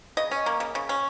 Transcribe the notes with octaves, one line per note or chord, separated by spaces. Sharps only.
C#3 D#5
C#4
A#3
C#3
C#3
C#4